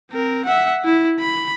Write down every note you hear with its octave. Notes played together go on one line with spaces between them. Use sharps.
C4 A#4
E5 F#5
E4
B5